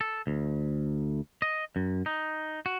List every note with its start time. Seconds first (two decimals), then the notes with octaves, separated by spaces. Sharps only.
0.01 A4
0.27 D2
1.42 D#5
1.76 F#2
2.06 D#4
2.66 F#4